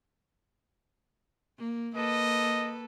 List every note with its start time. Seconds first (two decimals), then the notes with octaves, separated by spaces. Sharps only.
1.58 A#3
1.95 A#3 A4 B4 D#5